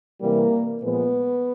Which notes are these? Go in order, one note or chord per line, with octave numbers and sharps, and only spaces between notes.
C3 E3 G3 A#3 A#4
A#2 F3 G#3 B3 B4